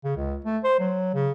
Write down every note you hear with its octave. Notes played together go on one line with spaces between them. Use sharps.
C#3
C#2
A3
C5
F#3
C#3